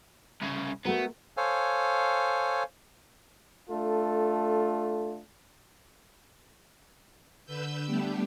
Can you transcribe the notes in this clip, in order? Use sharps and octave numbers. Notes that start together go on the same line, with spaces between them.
C2 C#3
A3 B3 F#4 A#4
A4 C5 C#5 F5 G#5
A3 D4 F4 A4
D3 B4 E6 G6
G3 A3 B3 D4 G4